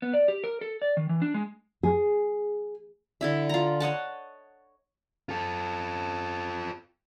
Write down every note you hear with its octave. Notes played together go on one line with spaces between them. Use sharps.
B3
D5
G4
A#4
A4
D5
D#3
E3
D4
G#3
G#4
D3 E4 E5
F4 A#5
C#5 D#5 F#5 A5
F4 A4